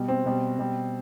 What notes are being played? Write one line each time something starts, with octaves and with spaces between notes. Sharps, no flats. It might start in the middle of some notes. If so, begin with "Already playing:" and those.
Already playing: B2 G3
C4
B2 G3
B2 G3